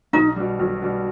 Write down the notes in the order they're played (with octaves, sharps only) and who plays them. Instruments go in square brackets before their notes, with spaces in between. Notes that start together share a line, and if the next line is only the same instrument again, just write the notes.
[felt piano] B1 [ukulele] D#4
[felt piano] B2 G3
B1
B2 G3